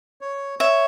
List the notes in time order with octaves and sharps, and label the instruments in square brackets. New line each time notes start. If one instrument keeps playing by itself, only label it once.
[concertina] C#5
[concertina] C#5 [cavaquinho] E5